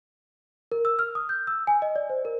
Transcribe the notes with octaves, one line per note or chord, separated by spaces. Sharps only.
A#4
E6
F6
D#6
G6
E6
G#5
D#5
D5
C5
A#4